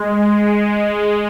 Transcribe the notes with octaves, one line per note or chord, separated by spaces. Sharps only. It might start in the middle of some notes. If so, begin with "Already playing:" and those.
Already playing: G#3